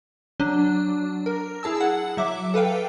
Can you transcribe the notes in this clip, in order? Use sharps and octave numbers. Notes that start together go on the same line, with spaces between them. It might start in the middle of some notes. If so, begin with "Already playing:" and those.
F#3 D4
A#4
E4 G#4 A5 E6
F#5
F#3 E5 D6
A4 B4 F5 G5